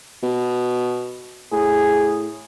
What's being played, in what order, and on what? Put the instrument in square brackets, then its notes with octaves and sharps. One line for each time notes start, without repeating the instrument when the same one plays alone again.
[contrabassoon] B2
[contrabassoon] A2 [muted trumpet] G#4